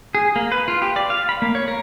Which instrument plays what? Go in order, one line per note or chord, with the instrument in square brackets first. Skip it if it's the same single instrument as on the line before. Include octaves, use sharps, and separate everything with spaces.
[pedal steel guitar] G#4
A#3
B4
F4
G4
D5
F5
B5
A#3
C#5
A#4